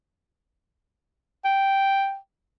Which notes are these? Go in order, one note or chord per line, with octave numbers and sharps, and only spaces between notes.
G5